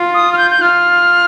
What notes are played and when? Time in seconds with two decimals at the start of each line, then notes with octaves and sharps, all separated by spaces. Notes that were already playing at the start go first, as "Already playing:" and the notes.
Already playing: F4
0.14 D#6
0.33 F6
0.38 G6
0.51 G6
0.61 F4 F6